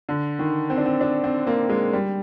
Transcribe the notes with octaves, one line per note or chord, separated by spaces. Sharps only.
D3
D#3
C4
D4
C4
D4
C4
A#3
G#3
G3